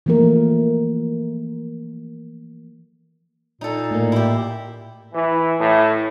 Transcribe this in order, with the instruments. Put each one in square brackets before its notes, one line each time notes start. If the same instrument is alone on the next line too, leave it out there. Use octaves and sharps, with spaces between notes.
[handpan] E3 F3 A3 A#3 A#4
[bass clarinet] A#2 [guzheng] D#4 A4
[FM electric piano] A2 A#3
[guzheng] E4 G4
[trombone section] E3
A2